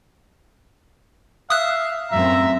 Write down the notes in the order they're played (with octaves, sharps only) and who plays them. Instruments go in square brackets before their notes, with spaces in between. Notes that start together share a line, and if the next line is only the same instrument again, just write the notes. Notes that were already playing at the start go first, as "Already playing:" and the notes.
[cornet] E5 [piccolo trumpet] F5 [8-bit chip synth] D#6 F#6
[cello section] F#2 A2 C4 [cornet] E5 [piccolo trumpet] A#5